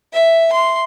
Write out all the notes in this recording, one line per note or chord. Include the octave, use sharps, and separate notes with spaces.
E5
C6